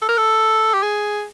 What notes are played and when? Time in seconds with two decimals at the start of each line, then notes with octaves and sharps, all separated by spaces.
0.02 A4
0.09 A#4
0.18 A4
0.74 G4
0.83 G#4